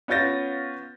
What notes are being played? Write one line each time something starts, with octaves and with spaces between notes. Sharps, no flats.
B3 C#4 F4 G6 A6 A#6